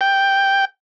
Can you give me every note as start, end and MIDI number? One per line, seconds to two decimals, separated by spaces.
0.01 0.65 79